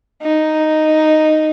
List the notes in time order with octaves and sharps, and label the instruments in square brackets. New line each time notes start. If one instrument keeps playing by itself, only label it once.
[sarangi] D#4